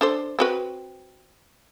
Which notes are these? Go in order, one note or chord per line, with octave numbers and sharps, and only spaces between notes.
D4 A4 C5
C4 F#4 B4